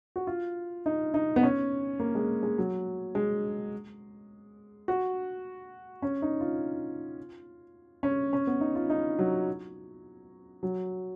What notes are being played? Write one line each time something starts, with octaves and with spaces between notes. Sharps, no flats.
F#4
F4
D#4
D#4
B3
C#4
A#3
G#3
G#3
F#3
G#3
F#4
C#4
D#4
F4
C#4
C#4
B3
D#4
F4
D#4
F#3
F#3